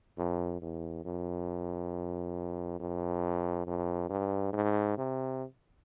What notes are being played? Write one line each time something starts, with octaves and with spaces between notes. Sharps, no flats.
F2
E2
F2
F2
F2
G2
G#2
C3